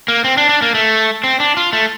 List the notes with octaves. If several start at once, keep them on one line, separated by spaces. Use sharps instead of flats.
A#3
C4
D4
D4
A#3
A3
C4
D4
F4
A3